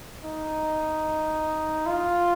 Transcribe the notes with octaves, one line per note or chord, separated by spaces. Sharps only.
D#4
F4